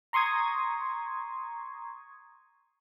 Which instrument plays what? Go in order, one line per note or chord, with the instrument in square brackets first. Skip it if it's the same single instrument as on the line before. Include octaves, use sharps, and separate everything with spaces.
[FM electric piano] A#5 C6 C#6 D#6 G#6